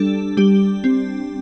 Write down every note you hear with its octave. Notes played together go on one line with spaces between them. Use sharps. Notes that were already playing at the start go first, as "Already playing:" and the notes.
Already playing: G3 D4 G4 A4
G3 G4
C4